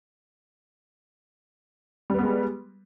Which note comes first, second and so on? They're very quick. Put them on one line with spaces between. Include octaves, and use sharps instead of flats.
G3 B4 B3 G#3